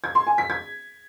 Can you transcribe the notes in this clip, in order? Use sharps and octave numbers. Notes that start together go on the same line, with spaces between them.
G#6
C6
G#5
B6
G#6